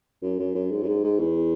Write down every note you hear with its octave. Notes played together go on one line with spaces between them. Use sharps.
F#2
F#2
F#2
G#2
F#2
G#2
G#2
E2